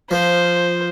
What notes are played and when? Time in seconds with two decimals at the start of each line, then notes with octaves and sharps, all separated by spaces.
0.11 F3 C5